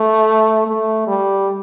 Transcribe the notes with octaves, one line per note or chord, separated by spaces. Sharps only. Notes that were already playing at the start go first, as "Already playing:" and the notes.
Already playing: A3
A3
G3